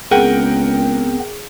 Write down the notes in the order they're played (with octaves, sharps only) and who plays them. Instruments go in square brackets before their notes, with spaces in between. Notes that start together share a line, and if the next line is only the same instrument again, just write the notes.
[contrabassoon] C#2 [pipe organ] B3 C4 [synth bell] G#4 [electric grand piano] A#4 F#5 G5